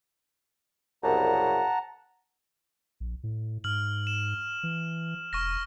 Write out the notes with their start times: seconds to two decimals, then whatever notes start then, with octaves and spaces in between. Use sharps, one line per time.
1.04 C2 F#2 C#3 F#5 A5 A#5
3.00 A#1
3.23 A2
3.64 G#2 F6 F#7
4.07 E7
4.63 E3
5.33 E1 C#6 F6 A#6